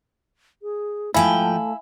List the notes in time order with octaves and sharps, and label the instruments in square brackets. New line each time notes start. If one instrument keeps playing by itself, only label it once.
[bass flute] G#4
[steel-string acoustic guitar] G#2 F3 G5 [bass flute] A3 [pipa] E4 [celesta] F5 G#5